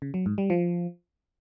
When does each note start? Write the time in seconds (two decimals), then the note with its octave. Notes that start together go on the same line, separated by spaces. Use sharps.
0.02 C#3
0.14 F#3
0.26 G#2
0.38 G3
0.50 F3